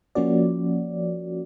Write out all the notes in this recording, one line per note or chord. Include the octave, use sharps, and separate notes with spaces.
F3 A#3 C#4 F#4 D5